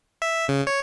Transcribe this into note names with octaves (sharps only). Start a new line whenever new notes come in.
E5
C#3
C#5